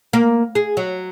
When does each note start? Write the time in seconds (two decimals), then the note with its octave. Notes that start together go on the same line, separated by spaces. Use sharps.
0.13 A#3
0.55 G#4
0.77 F#3